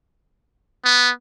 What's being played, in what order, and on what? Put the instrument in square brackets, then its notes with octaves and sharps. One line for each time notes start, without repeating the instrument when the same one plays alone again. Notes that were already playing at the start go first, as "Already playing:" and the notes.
[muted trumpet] B3